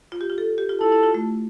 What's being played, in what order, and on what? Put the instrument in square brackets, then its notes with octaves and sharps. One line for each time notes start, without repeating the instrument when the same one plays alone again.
[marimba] F4
G4
F4
A4
G4
F4
[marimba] E4 [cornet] A4
[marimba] E4
F4
A3